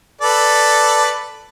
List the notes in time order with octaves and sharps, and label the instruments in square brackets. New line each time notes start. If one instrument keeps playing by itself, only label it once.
[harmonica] A4 B4 D5